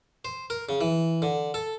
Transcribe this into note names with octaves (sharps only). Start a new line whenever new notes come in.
C5
A#4
C#3
E3
D3
A4